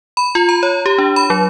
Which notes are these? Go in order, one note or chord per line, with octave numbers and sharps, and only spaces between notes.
B5
F4
A#5
C#5
G4
D4
B5
F#3